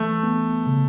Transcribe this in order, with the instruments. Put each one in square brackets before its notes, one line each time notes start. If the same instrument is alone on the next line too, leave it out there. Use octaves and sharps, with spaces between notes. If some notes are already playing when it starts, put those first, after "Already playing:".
Already playing: [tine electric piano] E3 [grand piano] A3
[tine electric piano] B3
C#3